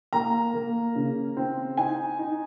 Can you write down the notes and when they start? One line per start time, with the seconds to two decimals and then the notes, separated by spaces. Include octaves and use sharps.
0.13 A#3 A#5
0.54 A#3
0.95 C#3
1.37 C4
1.77 D#4 G#5
2.19 D#4